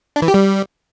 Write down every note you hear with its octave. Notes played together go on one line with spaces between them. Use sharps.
D4
E3
G4
G3